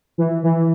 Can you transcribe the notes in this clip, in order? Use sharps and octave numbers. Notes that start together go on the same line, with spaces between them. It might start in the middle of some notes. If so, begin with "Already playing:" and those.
E3
E3